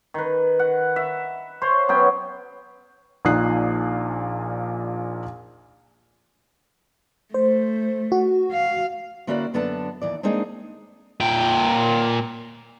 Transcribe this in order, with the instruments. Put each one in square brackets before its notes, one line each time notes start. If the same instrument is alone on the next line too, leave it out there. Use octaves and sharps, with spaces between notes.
[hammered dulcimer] D#3 B4
F#5
E5
C5 C#5 C6
F#3 B3 C#4 G5
[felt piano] A#1 A#2 D#4 D#6 F#6 C7
[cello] A3 [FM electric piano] C5
[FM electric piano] F#4
[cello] F5
[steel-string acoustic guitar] D3 A#3 C#4 E4 F#4 D5
F#2 D3 B3 D4 A4 A5
D#2 E3 D5
G#3 A#3 C4 D4 D#4 G#4
[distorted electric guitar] A#2 G5